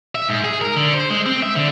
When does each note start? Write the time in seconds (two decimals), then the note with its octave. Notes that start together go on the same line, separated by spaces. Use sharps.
0.15 E5
0.29 G#2
0.44 G#4
0.61 A#4
0.76 D3
0.94 C5
1.10 G#3
1.26 C4
1.42 E5
1.56 D3